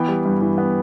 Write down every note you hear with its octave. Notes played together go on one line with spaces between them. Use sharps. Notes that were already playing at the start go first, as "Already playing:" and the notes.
Already playing: E3 B3 G5
G3
G2
E3
B3